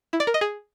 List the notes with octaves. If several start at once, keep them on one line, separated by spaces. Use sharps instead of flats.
E4
D5
A#4
D#5
G#4